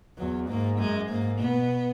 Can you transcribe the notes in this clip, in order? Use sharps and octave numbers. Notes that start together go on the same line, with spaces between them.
E2 F#3
G#2 A#3
F#2 G#3
G#2 A#3
B2 B3